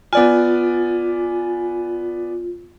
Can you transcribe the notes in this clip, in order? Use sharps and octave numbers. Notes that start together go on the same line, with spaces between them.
B3 F4 D5 G#5